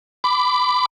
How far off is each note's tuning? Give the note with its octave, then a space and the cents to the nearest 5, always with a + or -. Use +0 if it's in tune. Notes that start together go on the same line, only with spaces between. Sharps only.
B5 +25 D6 +0